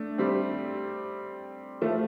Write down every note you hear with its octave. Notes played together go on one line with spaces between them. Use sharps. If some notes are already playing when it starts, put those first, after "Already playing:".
Already playing: A3 D4
G3 C4
F3 A3